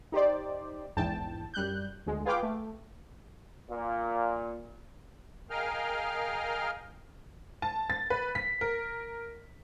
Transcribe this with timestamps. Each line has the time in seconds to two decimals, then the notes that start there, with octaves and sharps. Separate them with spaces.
0.12 D#4 G4 C5 D5
0.97 A#1 E2 G#2 G5 A5
1.54 F#2 G3 F#6 G6
2.06 D2 G#3
2.25 F4 G#4 B4 F5 G5 D6
2.43 A3
3.71 A#2
5.50 G#4 A#4 D#5 F5 G5 F6
7.62 A5
7.90 A6
8.10 B4
8.35 B6
8.61 A#4